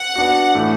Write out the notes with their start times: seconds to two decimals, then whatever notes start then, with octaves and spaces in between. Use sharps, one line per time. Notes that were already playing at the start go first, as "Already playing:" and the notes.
Already playing: F#5
0.16 B3 D4 F#4
0.55 A2 E3 A3